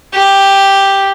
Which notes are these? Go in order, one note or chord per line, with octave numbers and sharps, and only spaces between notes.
G4